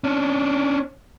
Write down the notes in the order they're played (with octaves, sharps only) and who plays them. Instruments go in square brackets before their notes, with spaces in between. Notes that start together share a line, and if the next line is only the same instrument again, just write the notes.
[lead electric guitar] C#4 D4